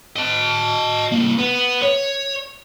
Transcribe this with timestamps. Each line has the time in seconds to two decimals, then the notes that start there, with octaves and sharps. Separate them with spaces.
0.16 D#5 A5
1.11 C2 A#3
1.38 B3
1.83 C#5